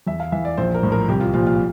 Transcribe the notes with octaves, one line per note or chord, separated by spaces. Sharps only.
E2 E5
F5
E3 E5
D5
A#1 C5
A#4
A2 F3
A#4
C2 G4
F4
A#2 F3 F4
F4